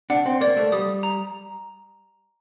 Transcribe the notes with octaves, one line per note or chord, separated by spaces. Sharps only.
D4 F#5
C4
A#3 D5
A3
G3 D#6
A#5